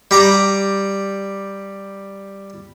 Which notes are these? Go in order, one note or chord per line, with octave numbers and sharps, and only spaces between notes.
G3 A#5 D6